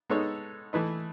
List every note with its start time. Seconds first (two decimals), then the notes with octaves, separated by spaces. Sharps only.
0.10 G#3 B3 D#4 A4 C#5
0.73 E3 A3 E4 B4 D#5